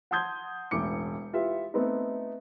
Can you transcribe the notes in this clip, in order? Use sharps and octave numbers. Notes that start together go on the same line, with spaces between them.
F#5 A5 C6 D#6 G6 G#6
E1 A1 D6 C#7
E4 F4 G4 B4 E5
A3 B3 C4 D#4